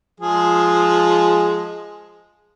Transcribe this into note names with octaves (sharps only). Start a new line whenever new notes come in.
F3 G#3 G#4